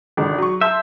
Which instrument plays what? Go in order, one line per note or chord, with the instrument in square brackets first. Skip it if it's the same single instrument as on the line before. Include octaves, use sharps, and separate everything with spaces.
[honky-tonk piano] G#1 C#2 D3
F#3 C#6
[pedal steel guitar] E5 [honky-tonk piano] A5 C6 G6